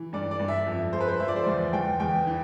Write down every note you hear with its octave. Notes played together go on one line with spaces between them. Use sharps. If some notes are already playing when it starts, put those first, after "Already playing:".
Already playing: E3
G2 D5
D5
G2
E5
F2
F3 C5
B4
C5
F3 E5
D5
C5
E2 D5
E2 G5
E2 G5
E3